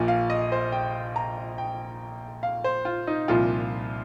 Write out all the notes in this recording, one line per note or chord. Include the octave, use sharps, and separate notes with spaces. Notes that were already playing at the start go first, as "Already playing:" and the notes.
Already playing: A#1 A#2 F3
F5
D#5
C5
G5
A#5
G5
F5
C5
F4
D#4
C2 A#2 F3 F4